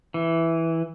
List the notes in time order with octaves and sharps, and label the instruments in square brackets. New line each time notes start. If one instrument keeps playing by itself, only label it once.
[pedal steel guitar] E3